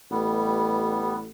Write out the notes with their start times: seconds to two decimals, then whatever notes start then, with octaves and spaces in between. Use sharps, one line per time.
0.11 A1 G3 B3